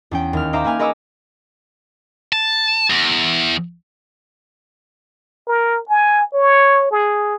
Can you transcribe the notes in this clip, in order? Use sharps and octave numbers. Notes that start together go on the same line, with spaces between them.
E2 C#4 G5
D#2 F6
D#4 C5 E5 F5 A#5 D6
A#3 B4 G#5 F6
A#4 B4 D#5 C#6 D6 E6
A5
E2
A#4
G#5
C#5
G#4